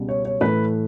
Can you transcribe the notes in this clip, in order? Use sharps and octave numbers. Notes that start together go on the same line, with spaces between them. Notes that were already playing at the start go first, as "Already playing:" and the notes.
Already playing: C#2 B2 G3
C#5
C#5
A2 E3 A3 B4